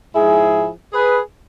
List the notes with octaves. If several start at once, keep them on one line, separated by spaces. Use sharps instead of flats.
G#2 F3 E4 G#4
G#4 B4